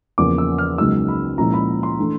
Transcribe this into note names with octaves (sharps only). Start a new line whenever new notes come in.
E2 C#3 F3 A#3 D6
E6
F6
C#2 C#3 F#3 A#3 D#4 E6
B5
A#2 F3 G#3 C#4 E4 A#5
B5
C6
E3 A3 D4